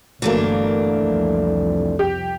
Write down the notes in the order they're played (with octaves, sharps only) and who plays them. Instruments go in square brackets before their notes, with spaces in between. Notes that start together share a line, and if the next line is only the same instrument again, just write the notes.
[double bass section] G1 [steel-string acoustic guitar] E3 A3 D4 [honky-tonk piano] F#3 A#3
[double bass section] C2 F2
[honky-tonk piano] G4